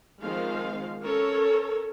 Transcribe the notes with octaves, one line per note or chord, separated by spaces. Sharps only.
D#3 F3 G#3 C4 F5
C#4 A4 A#4 C#5